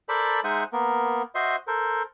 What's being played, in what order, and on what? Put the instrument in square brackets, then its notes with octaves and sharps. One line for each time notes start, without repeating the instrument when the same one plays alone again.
[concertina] A4 A#4 C5 D5 A5 B5
G#3 D#4 C5 E5 F#5 D#6
A#3 B3 A#4
F#4 C5 D#5 E5 C6
A4 A#4 C5